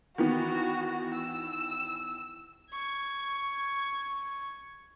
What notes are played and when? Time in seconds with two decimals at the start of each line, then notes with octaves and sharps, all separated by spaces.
0.18 D#3 E3 B3 F#4
1.15 E6
2.71 C#6 G#6